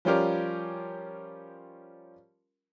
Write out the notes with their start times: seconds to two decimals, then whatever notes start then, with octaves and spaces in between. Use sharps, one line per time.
0.05 F3 G3 C#4 F4 G4 A#4